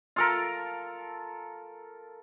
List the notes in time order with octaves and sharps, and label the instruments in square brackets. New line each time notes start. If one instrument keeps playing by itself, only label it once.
[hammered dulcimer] F4 A4 A#4